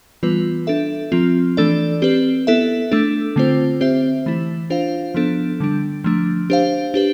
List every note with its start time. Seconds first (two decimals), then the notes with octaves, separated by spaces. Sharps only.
0.23 E3 G3 B3 F4 B4
0.67 D4 A4 E5
1.12 F3 C4 F4
1.57 E3 A3 D4 A4 D5
2.02 C4 G4 B4
2.47 B3 E4 A4 E5
2.92 A3 D4 A4
3.36 D3 A3 C4 F4 C5
3.81 C4 G4 C5 E5
4.26 E3 A3 E4
4.70 D4 F4 C5 F5
5.14 F3 B3 D4 A4
5.60 D3 G3 D4
6.04 F3 A3 D4
6.50 D4 G4 C5 F5
6.94 D4 G4 B4